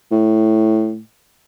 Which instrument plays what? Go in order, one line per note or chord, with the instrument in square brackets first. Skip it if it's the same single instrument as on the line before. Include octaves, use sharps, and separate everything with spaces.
[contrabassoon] A2